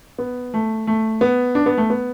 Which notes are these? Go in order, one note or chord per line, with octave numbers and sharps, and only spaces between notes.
B3
A3
A3
B3
D4
B3
A3
B3